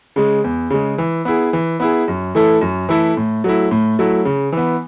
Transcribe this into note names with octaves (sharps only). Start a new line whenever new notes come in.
C#3 G#3
E2
C#3 G#3
E3
B3 E4 G#4
E3
B3 E4 G#4
F#2
E3 A3 E4 A4
F#2
E3 A3 E4 A4
A2
F#3 A3 E4
A2
F#3 A3 E4
C#3
E3 B3